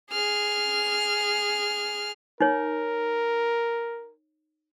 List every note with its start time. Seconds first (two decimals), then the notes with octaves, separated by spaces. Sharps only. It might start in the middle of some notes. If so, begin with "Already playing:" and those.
0.11 G#4 F6
2.41 D#4 A#4 C#5